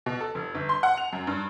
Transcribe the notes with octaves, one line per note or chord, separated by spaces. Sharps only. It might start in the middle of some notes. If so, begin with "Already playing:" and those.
B2
A4
F1
G1
C6
F#5
F7
F#2
G2